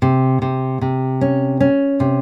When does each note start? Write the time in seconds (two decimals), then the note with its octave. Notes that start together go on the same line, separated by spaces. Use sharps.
0.02 C3
0.42 C3
0.81 C3
1.21 C#4
1.60 C#4
2.00 C3